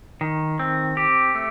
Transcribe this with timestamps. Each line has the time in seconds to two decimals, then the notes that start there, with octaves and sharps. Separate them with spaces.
0.21 D#3
0.59 C4
0.97 G4
1.35 A3